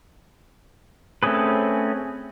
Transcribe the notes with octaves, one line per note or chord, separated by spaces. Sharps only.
A3 C4 C#4 G#4 B4